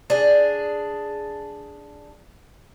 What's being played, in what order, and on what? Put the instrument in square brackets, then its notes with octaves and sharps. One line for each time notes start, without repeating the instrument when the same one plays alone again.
[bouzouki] D4 G#4